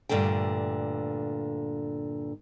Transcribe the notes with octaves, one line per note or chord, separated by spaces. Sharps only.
G2 A#2 D3 A3 G5